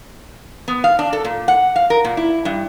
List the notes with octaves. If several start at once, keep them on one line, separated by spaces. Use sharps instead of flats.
B3
F5
D4
A4
A#2
F#5
F5
A#4
A#2
E4
G2